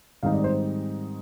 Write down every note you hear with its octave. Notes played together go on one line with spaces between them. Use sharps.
G#2 D#3 G3 C4 D#4 F5
D5
C5